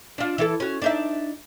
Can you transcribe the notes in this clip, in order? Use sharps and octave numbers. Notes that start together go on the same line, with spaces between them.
D4 F4
E3 E4 A4
C#4 F#4
D4 D#4 E5